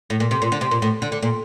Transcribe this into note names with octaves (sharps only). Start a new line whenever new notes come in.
A2
A#2
C3
A#2
D3
C3
A#2
A2
D3
D3
A#2